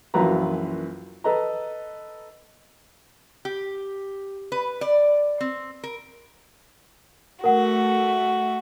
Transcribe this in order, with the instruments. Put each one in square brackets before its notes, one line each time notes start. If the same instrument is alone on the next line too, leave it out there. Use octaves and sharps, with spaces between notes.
[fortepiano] A#1 F#2 E3 F4 B4 A#5
A4 B4 D#5 A#5
[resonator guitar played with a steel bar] G4
B4
D5
C4
A#4
[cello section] A3 [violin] F#4 [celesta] A#4 F#5